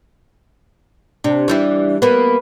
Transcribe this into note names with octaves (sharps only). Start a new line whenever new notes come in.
C3 D4
E3 G3 E4
A#3 B3 B4